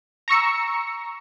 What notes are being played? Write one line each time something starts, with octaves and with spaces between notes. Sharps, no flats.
A#5 C#6 E6 C#7